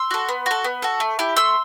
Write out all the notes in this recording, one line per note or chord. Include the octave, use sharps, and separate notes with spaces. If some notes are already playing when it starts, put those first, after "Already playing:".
Already playing: C6 E6
F#4 A4
B3
F#4 A4
B3
F#4 A4
A3
E4 G4
A3 C6 E6